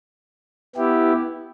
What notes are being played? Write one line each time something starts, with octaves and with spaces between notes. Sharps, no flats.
B3 E4 G4